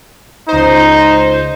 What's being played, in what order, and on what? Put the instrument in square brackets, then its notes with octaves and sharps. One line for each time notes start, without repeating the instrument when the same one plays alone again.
[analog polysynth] C#2 C5 [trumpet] D#4